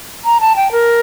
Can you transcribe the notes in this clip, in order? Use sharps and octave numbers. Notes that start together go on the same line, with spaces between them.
A#5
A5
G5
A#4